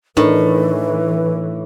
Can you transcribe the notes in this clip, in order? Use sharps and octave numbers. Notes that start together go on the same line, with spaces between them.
A2 E3 D4 D#4 A#4 B4